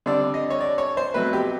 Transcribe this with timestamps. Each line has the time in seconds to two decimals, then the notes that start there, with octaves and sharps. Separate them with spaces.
0.06 D3 G3 C4 D5
0.34 D#5
0.50 C#5
0.61 D5
0.78 C#5
0.97 C5
1.14 B2 F#3 A3 C4 B4
1.33 G4